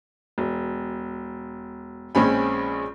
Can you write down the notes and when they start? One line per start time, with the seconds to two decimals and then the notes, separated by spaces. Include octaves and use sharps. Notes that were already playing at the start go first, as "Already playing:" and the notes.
0.38 E1
2.15 A#1 G#3 C4 C#4 G#4 B5